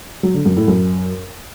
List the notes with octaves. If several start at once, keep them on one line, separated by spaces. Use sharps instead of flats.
F#3
D3
F#2
A2
F#2